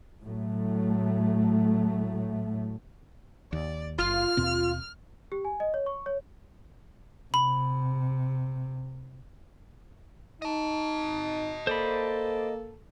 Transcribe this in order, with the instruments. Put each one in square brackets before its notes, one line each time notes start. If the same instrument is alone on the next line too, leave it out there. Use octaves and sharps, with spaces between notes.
[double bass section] A2 F#3 A3
[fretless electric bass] D#2 [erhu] D5
[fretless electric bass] F#1 [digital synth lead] F4 [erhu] F6
[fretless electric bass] D#2 B2 C4
[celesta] G4
G#5
D#5
C#5
C#6
C#5
[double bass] C3 [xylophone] B5
[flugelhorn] D#4 [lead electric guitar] D#5 A5
[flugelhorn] A#3 [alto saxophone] A4 [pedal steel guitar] C5 D5 B5